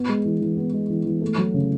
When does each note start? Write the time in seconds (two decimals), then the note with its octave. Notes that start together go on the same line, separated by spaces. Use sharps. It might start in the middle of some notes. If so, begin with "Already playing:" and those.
Already playing: B3
0.09 G#3
0.25 E3
0.41 E3
0.57 B3
0.73 G#3
0.90 E3
1.06 E3
1.22 A3
1.38 F#3
1.54 C#3